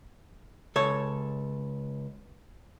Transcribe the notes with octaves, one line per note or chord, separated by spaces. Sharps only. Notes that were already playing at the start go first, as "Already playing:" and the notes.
C#2 A4 C#5